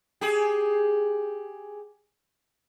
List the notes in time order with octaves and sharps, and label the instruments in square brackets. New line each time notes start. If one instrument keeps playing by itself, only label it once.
[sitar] G4 G#4